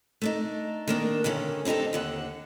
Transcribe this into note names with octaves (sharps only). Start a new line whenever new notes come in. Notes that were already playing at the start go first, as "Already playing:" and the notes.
A3 D4 D#4
D#3 A#3 D4
G2 D3 D#3 C#4
C4 D4 D#4 G4 A4
D#2 D3 F#5